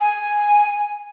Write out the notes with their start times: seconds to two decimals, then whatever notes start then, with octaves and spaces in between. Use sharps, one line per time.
0.01 G#5